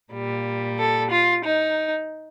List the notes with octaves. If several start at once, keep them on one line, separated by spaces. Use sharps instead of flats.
A#2 G3
A4
F4
D#4